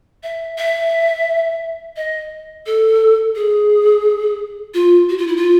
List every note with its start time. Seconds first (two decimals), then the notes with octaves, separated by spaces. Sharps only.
0.23 E5
0.58 E5
1.97 D#5
2.66 A4
3.35 G#4
4.74 F4
5.09 F#4
5.18 F4
5.27 E4
5.36 F4